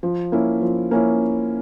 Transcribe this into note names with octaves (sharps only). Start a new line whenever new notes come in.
F3
A#3 C#4 E4
F3
A#3 C#4 E4